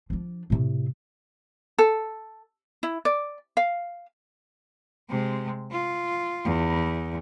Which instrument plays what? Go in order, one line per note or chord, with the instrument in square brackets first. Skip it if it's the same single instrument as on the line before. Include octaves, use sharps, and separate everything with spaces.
[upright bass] F3 D4
A2 C3
[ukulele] A4
E4
D5
F5
[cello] C3 G#3
F4
E2